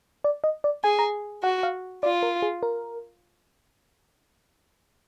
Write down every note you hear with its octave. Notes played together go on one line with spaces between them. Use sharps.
D5
D#5
D5
G#4 G#5
A#5
F#4 F#5
F5
F4 D5
A#4
G#4
A#4